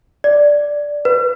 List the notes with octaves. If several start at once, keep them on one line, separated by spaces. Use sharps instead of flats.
D5
B4